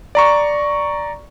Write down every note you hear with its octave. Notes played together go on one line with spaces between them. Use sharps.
D5 A#5 C#6